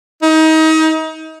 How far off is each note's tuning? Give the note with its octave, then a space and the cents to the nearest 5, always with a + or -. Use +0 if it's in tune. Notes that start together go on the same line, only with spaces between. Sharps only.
D#4 +30